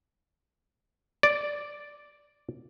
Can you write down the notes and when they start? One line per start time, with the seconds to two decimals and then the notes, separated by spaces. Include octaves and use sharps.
1.23 D5